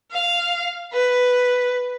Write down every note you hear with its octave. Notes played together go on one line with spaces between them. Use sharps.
F5
B4